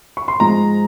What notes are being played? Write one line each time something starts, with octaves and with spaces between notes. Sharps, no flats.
C#6
C6
G#2 F3 G#3 A#5